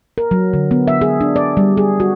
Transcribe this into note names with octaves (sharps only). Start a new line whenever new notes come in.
A#4
F#3
D3
B3
E5
G#4
D4
D5
G3
G#4
F#4